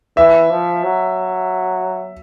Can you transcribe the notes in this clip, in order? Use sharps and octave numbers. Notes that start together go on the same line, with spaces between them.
E3 E5
F3
F#3